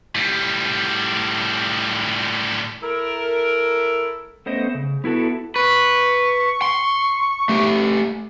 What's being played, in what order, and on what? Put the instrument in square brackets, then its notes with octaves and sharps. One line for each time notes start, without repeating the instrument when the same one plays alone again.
[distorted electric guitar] A2 G3
[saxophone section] E4 A4 A#4
[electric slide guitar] A3 B3 C#4 C5 D#5
C#3
B3 E4 F#4 A4
[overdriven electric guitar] B4 [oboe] C#6
[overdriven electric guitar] C6
A3 G4